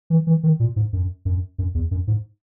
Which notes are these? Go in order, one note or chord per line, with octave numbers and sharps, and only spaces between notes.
E3
E3
D#3
A#2
G#2
F#2
F#2
F#2
E2
F#2
G#2